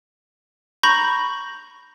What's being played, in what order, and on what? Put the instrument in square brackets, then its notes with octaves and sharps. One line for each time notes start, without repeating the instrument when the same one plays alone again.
[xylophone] A#5 B5 C#6 G6 A#6